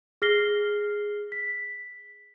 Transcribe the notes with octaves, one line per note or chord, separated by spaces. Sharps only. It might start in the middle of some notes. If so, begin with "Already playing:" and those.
G#4 F6 A#6 C7 G7
B6